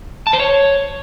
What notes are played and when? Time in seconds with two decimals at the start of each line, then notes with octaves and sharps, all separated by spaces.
0.27 A5
0.33 C5
0.40 C#5